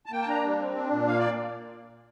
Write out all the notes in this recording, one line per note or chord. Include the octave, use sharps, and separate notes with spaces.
A5
A#3 G5
A5
D4 A#5
G3
C4
D4
A#2
A#3 F5
D5